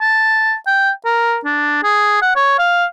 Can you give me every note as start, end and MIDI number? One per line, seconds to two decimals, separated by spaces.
0.01 0.54 81
0.67 0.91 79
1.06 1.38 70
1.45 1.82 62
1.84 2.18 68
2.22 2.35 78
2.37 2.55 73
2.59 2.86 77